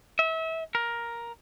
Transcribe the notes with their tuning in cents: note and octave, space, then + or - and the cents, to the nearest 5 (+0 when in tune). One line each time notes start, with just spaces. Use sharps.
E5 -30
A#4 +10